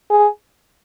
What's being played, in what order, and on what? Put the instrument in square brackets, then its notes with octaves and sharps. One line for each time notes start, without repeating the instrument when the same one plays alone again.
[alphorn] G#4